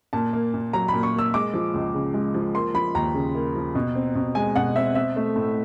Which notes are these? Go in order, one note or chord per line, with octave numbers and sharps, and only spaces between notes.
A#2 A5
A#3
A#2
F#3 A#5
B5
A#2
C#6
A#3 E6
G#3 D6
F3
C#2
C#3
G#3
F3
A#3 C6
F3 B5
D#2 A#5
C#3
A#3
F3
B2
C4
B2
G#3 G#5
B2 F#5
C4 E5
C4 E5
A3
A2